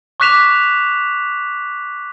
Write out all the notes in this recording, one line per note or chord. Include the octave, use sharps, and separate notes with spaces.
C#6 D6 F#6 B6 E7 F7